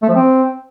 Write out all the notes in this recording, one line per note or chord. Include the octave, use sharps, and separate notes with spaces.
A3
F3
C4